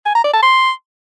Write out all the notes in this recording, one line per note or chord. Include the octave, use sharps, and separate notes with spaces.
G#5
A#5
D5
A5
C6